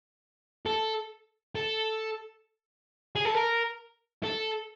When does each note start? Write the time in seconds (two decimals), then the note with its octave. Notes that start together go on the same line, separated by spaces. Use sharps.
0.66 A4
1.55 A4
3.15 G#4
3.25 A4
3.34 A#4
4.24 A4